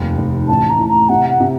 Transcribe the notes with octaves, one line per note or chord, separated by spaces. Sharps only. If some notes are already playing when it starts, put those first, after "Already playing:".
Already playing: F1 D#2
F1
A1 A5
A#5
A2
A#5
C3 F#5
F#5
C3